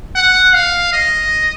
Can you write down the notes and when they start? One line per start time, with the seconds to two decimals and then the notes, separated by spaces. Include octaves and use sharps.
0.16 F#5
0.54 F5
0.93 D#5